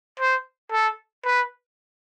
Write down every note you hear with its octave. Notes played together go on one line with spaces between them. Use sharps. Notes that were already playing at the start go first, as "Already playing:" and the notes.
C5
A4
B4